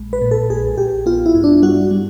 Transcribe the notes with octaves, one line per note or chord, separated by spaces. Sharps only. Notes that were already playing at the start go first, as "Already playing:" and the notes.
Already playing: A#1 G#3
B4
A#2
A4
A#1 G#4
A#1 G4
B3 F4
E4
G2
D4
G3 F#4
G3